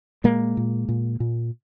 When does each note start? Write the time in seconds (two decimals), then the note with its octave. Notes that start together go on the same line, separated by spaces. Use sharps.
0.24 A#2 G#3 A#3
0.57 A#2
0.89 A#2
1.20 A#2